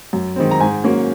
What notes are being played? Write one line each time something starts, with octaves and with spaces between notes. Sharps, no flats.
F#2
D#3 G#3 C4
A#5
G#2 G#5
F#3 A#3 C#4